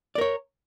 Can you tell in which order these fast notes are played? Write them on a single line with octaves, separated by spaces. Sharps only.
D5 A#4 C#5